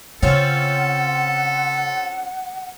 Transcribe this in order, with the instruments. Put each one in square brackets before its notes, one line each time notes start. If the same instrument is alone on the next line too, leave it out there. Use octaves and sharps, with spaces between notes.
[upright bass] C#3 [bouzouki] C4 C#4 F4 [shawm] A4 [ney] F#5